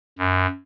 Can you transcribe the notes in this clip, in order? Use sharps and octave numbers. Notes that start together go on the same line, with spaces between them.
F#2